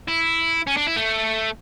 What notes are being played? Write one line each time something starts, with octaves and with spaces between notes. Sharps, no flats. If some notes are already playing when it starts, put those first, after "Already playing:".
E4
C#4
D4
E4
A3